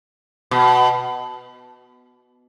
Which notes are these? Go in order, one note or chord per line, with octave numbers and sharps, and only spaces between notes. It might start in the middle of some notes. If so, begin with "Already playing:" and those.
B2